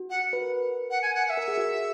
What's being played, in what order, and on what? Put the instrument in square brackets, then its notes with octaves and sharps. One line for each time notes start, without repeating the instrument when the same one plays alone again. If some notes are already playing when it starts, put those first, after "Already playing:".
Already playing: [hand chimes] F#4
[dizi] F#5
[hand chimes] B4
A#4
[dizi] F#5
G#5
F#5
F#5
E5
[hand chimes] A#4
G#4
F#4
G#4